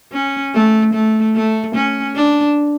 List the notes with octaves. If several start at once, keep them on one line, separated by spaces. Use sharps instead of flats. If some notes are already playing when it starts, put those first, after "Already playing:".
C#4
A3
A3
A3
C#4
D4